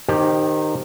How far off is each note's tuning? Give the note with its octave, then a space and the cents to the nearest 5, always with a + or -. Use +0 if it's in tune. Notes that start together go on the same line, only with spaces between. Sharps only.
D#3 -15 G4 +0 C5 +0